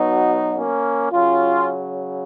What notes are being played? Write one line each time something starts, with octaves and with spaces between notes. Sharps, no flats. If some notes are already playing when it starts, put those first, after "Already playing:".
Already playing: B2 F#3 B3 D#4
A#3 C#4
C#3 F#3 C#4 F4